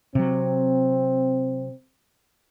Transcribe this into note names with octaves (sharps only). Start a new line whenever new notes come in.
C3 F#3 C4